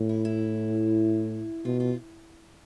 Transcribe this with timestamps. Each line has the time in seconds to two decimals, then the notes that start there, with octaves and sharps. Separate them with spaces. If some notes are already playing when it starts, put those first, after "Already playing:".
Already playing: A2
0.09 E4
0.25 E4
1.65 B2 F4
1.80 F4